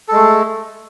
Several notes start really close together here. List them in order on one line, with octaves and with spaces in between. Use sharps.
A4 G#3 A3